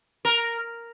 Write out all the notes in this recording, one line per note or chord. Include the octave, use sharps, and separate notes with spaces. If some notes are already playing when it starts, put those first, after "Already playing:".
A#4